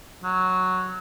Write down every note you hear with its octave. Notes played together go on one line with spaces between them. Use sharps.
F#3